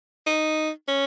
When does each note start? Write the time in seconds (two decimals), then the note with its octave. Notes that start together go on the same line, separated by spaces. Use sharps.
0.27 D#4
0.88 C#4